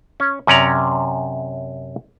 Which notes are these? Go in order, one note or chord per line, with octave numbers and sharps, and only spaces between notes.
C#4
F#2 C3 C#4 D5 A#5